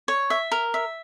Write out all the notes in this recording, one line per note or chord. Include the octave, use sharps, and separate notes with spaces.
C#5
E5
A#4
E5